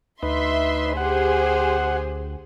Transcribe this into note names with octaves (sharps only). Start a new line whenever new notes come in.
D2 D#4 B4 E5 C6
G4 G#4 C5 F#5